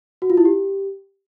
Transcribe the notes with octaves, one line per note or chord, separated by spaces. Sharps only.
F#4
F4
E4
G4